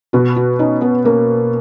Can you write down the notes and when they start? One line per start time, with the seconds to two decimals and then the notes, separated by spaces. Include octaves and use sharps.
0.13 B2 F#4
0.36 F#4
0.59 C#4 D#4
0.81 B3
1.04 A#3 C#4